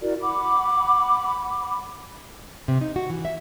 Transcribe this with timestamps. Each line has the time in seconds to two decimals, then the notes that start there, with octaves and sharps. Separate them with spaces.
0.01 E4 F#4 A#4 D5
0.21 F#5 B5 D6
2.68 C3
2.81 D#4
2.96 F#4
3.10 E3
3.25 E5